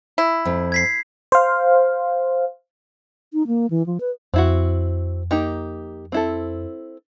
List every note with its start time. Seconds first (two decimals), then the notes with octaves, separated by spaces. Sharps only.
0.18 E4
0.45 F2
0.72 G#6 B6 C7
1.32 C5 F5
3.33 D#4
3.47 A#3
3.70 E3
3.86 F3
4.00 B4
4.34 F2 C4 E4 F#4
5.31 A#3 D#4 G4
6.12 C4 E4 A4